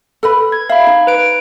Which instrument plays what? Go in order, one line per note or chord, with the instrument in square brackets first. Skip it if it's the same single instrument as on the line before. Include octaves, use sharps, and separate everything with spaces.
[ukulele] A4 B4 B5
[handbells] G#6
[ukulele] E5 [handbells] F5 B5
[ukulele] D#4
[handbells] B4 D7